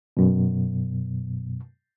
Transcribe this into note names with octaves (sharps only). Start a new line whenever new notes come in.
F#2 B2